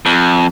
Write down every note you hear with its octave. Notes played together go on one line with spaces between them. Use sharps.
F2